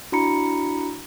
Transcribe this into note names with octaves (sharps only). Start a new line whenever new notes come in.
D4 E4 F#4 A#5 B5 C#7